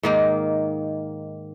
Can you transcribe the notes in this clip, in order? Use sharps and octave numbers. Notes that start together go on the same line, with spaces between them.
G#2 D#3 A#3